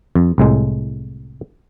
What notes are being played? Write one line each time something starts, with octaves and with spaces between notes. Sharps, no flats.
F2
C2 A2 G#3